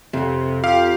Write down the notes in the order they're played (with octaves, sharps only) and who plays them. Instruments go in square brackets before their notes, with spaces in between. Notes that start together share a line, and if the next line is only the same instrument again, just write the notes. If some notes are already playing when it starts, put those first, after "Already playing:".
[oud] F2 [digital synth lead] C3
[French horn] F4 [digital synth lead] G4 [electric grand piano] F5